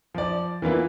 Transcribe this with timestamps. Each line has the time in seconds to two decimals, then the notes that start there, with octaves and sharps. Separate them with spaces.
0.15 F3 D5
0.62 E3 A#3 B3 F4